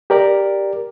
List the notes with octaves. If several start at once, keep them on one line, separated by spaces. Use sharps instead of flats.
G4 A#4 D5